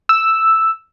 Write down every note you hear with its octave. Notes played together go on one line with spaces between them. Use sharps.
E6